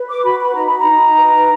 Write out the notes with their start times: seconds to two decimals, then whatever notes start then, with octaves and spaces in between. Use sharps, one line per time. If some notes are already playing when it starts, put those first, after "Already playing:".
Already playing: B4
0.09 D6
0.24 F#4 B5
0.40 B5
0.55 D#4 A#5
0.67 B5
0.78 A#5
0.87 D#4
1.18 B4